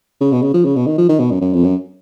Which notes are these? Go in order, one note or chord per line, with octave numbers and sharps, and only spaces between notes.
C#3
B2
C#3
F3
C#3
B2
D#3
F3
D#3
B2
F#2
F#2
F2
F#2